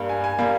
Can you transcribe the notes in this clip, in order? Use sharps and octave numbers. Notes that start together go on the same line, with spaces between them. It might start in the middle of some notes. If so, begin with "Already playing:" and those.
Already playing: G2 G3 A#3
G#5
G#5
G3 A#3